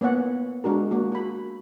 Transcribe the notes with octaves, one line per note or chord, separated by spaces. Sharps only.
A#3 B3 C#5 F#5
G#3 D4 F#4 A#4
A#3 F#4
F#4 B5